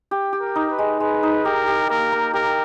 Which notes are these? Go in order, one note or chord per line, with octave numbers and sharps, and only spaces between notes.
G4
G4
A#4
D#4
B4
G#3
G#3 B4
D#4
G4 A#4
G4
A#3 A#4
A#3
G4 A#4